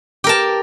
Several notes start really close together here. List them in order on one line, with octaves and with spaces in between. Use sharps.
G4 A#4 A5